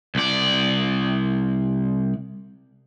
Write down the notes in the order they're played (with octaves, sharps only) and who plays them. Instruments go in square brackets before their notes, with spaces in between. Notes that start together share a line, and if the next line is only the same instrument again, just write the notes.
[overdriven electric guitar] C2 D5